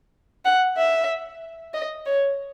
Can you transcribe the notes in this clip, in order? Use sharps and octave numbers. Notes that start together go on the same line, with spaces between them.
F#5
E5
D#5
C#5